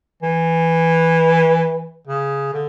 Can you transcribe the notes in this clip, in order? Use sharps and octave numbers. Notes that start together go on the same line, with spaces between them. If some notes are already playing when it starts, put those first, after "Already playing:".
E3
C#3
D3